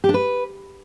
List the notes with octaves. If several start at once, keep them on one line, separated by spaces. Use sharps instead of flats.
G4
D4
B4